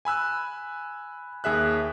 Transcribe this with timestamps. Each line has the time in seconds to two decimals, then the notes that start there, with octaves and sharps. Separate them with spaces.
0.05 G#5 B5 E6 F#6
1.44 D#2 G#4 E5 F#6